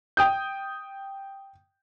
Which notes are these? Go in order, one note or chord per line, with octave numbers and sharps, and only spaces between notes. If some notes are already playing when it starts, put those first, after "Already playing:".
G5 D#6 G6